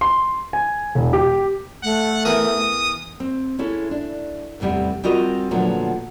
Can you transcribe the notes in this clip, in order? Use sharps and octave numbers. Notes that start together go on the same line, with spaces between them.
C6
G#5
E1
G4
A3 F#5
E2 A#4 D#6
C4
G#3 C#4 E4 A4
D4
E2 A2 C3 G3 B3
G3 C4 F4 F#4 A#4 D#5
A#2 D3 F3 F#3 A3 B3